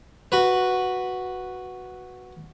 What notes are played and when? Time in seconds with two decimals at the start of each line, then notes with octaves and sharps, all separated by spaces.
0.32 F#4 B4